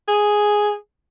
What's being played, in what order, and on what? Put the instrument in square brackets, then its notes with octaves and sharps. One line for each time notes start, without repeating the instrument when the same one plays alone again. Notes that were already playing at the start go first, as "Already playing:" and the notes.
[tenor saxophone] G#4